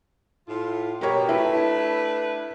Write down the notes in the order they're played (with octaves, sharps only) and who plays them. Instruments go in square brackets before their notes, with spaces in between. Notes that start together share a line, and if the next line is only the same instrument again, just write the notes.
[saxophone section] A2 F4
[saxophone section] B2 [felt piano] G4 A#4 C#5
[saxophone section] A3 D4 B4 [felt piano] E4